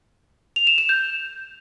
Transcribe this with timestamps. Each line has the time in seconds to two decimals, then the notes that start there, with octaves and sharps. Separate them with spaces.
0.56 F7
0.67 E7
0.78 E7
0.89 G6